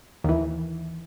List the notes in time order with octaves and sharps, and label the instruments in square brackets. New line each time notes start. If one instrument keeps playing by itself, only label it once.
[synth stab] D#2 E3